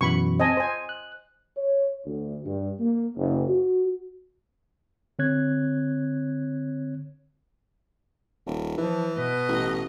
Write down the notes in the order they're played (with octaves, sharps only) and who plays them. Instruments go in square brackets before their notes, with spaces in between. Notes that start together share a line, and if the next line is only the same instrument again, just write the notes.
[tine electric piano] F#2 B2 E3 [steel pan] B5 C#6
[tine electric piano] C4 C5 A5 [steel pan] D#5 G#5
[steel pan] C5 G#5 [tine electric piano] C6
[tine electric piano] F#6
[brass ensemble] C#5
D2
G2
A#3
F#1
F#4
[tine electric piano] D3 C4 C#5 F#6 G#6
[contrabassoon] D#1
[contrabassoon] E3 [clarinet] F3
[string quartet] B2 D#5 [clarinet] B4
[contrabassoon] A1